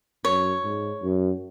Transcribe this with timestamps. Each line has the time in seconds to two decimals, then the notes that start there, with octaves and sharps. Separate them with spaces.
0.25 F#2 C#5
0.64 G#2
1.02 F#2